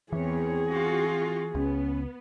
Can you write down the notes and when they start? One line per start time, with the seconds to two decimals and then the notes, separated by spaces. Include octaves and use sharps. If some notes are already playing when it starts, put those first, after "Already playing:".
0.13 E2 E3 C4 G#4 C#5
0.72 F4 F#4
1.55 C#2 B3 C#4